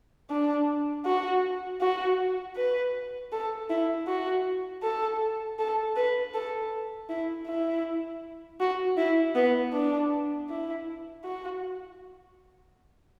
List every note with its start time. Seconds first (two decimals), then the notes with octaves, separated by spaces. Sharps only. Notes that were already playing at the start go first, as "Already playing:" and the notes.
0.30 D4
1.06 F#4
1.81 F#4
2.56 B4
3.32 A4
3.70 E4
4.07 F#4
4.83 A4
5.59 A4
5.96 B4
6.35 A4
7.09 E4
7.47 E4
8.60 F#4
8.98 E4
9.35 B3
9.73 D4
10.50 E4
11.25 F#4